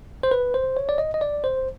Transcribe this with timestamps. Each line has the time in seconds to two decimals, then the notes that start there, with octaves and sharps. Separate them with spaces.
0.23 C5
0.31 B4
0.54 C5
0.77 C#5
0.89 D5
0.98 D#5
1.14 D#5
1.21 D5
1.44 C5